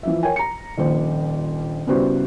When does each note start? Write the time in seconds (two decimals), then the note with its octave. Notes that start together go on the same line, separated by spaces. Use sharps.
0.03 E3 F3 E5
0.23 A#4 C#5 G5 G#5
0.36 A#5 C#7
0.78 D#1 A#1 C5
1.87 C#3 G3 B3 E4 F#4 C5